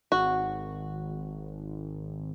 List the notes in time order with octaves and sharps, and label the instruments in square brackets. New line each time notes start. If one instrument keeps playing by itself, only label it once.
[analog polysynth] G#1 [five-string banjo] F#4